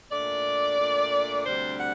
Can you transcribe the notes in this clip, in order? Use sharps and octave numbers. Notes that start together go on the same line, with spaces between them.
A#2 A3 D4 D5
A#2 A3 D4
D2 C3 G3 D4 C5
F#5